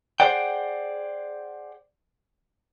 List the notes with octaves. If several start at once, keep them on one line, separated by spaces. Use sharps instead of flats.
G#4 A#4 C5 D5 F#5 G5